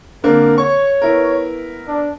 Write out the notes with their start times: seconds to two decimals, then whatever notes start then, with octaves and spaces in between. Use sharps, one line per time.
0.24 D3 A#3 C4 A#4
0.58 C#5 C#6
1.02 B3 E4 A#4
1.87 D4